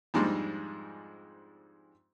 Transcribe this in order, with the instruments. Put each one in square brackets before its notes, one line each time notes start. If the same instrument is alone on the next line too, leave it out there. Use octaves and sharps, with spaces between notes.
[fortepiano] F2 G#2 G3 G#3 D4 C6